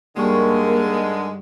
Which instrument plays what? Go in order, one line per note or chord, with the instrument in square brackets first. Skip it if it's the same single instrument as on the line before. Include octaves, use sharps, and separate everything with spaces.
[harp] G2 G3 C#6 [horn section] D3 D#3 G#3 [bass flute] A#3